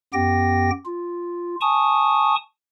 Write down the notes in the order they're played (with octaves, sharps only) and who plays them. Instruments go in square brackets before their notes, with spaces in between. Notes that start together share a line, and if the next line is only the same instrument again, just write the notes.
[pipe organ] F#2 B3 G4 G5 A#6
F4
G#5 A5 C#6 D#6